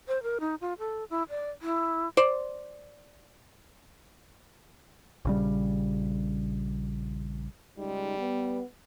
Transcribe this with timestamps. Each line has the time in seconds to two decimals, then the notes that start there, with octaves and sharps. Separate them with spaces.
0.08 C5
0.23 A#4
0.40 D#4
0.61 F4
0.79 A4
1.10 E4
1.30 D5
1.62 E4
2.17 C5 D5
5.25 A#1 C#3 G3
7.78 C#2 G3 G#3 D#4
8.19 B3